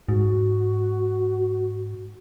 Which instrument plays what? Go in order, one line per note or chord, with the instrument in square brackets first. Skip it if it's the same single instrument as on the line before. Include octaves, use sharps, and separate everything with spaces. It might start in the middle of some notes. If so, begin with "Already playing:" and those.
[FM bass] G#2 [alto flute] F#4